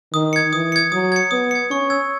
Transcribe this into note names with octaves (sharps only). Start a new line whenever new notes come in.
D#3 D#6
G#6 C#7
E3 D#6
G#6 C#7
F#3 D#6
G#6 C#7
B3 D#6
G#6 C#7
C#4 C#6
E6 G#6